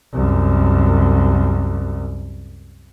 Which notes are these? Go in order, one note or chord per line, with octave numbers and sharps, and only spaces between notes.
C2 F#2